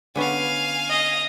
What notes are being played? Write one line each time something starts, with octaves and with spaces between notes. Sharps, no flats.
D3 B3 C#4 F5 G#5
D#5